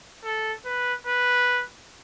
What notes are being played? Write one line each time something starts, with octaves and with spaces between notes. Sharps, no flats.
A4
B4
B4